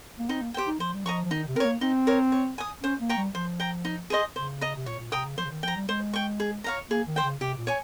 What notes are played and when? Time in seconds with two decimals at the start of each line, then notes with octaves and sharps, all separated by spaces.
0.19 A#3
0.29 C4 D#4
0.42 A#3
0.54 G4 C5 G5
0.67 D#4
0.80 F3 C5
0.95 G3
1.05 F3 D#5 A#5 C#6
1.25 F3
1.31 D#3 D#4
1.48 C3
1.56 C4 A#4
1.60 A#3 C#5
1.81 C4 D#4
2.07 A#4 C#5
2.32 C#5
2.58 G#5 D#6
2.83 C#4 C5
3.01 A#3
3.09 G5 A#5 C#6
3.17 G3
3.35 F3 C5
3.60 G5 A#5
3.85 D#4
4.10 G#4 C5 D#5
4.36 C#3 C5
4.61 D#5 A#5
4.76 C3
4.86 A#2 C#5
4.99 A#2
5.12 C3 G5 A#5 D#6
5.25 C#3
5.38 F3 C5
5.45 C#3
5.51 D#3
5.63 F3 G5
5.68 A#5
5.76 G3
5.89 G#3 C5
6.13 G5 C#6
6.40 G#4
6.64 C#5 F5 A#5
6.90 A#3 G#4
7.08 D#3
7.16 C5 G5
7.24 C#3
7.41 C3 G4
7.58 A#2
7.67 C#5 G#5